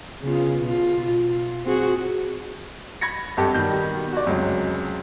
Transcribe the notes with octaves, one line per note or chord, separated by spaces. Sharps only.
C#3 B3 F4
B2 F4
F4
C4 F#4 G#4
B5 G#6 A#6 C#7
G#1 G2 G4 A4 A5
B2 D#3 G3 G6
F#4 D5
F1 C#2 F#3 G#3